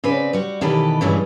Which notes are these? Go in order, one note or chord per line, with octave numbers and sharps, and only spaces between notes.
C#3 C4 B4 D5
G3 F#4
B2 D#3 E3 G4 A4 B4
G2 A#2 C#3 E3 G3 G#3